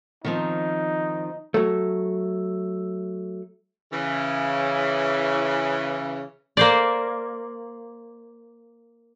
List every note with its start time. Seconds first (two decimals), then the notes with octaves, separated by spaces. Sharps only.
0.25 D#3 F3 C4 D#4
1.54 F#3 A3
3.92 C#3 E3
6.57 A#3 C5 D5